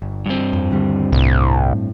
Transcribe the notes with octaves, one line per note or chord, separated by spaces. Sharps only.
G1
G2 C4
F2
D#2 D3 G3
C2 A2